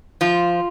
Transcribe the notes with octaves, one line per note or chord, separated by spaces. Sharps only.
F3 F4